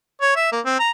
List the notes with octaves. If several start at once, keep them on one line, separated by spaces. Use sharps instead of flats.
C#5
E5
A#3
C4
A#5